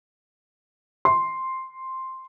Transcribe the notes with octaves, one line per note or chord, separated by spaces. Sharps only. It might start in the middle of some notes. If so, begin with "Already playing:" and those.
C6